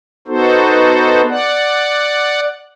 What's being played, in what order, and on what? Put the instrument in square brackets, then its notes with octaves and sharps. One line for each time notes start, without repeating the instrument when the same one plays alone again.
[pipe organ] B3 D#4 F#4 A4 C5
D5 F#5